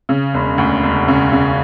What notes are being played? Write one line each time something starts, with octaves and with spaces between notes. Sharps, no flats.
C#3
E1
D2
E1
C#3
C#3